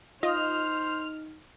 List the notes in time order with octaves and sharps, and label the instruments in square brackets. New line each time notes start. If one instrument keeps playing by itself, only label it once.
[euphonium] D#4 [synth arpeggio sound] F4 D#5 [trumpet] C5 [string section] F6